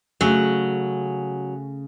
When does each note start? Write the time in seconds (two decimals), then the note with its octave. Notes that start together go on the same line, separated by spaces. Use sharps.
0.21 C#3 F#3 A3